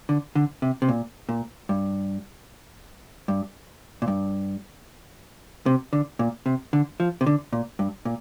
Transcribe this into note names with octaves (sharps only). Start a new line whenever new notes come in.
D3
D3
C3
C3
A#2
A#2
G2
G2
A#2
G2
C3
D3
A#2
C3
D3
F3
C3
D3
A#2
G2
A#2